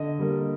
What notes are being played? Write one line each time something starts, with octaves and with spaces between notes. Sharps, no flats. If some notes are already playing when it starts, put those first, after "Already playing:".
Already playing: D3 D#5
G3 A#3